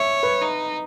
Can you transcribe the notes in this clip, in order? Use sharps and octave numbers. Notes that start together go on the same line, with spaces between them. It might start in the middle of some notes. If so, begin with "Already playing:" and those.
Already playing: C#5 E5
B4
D#4